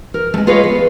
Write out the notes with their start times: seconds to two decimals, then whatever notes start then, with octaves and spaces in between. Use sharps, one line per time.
0.14 A#4
0.34 G#3 A3
0.47 F4 G#4 B4 C#5 D#5 F5
0.64 B3